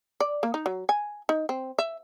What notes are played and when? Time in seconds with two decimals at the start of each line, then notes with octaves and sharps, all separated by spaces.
0.20 D5
0.43 A#3
0.54 D#4
0.66 F#3
0.89 G#5
1.29 D#4
1.49 C4
1.79 E5